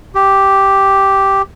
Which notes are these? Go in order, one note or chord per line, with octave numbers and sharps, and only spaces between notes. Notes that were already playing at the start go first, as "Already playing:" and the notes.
G4